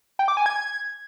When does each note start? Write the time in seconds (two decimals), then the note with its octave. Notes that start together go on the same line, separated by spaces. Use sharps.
0.19 G5
0.28 D6
0.37 G#5
0.46 G#6